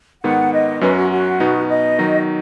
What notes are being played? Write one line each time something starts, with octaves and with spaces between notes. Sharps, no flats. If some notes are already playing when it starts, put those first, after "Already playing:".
G#2 D#3 B3 F#5
D#5
F#2 F#3 C#4 B4
F#4
F#4
B2 B3 D#4
D#5
D#3 F#3 D#4